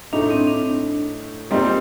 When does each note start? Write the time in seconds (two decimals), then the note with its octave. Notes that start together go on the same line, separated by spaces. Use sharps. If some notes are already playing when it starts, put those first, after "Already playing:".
0.13 A2 A3 D4 D#4
0.30 C4
0.47 D4
1.51 A#2 G3 C4 D#4 G4